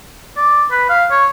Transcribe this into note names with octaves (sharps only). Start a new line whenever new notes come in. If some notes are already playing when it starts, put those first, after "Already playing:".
D5
B4
F5
C#5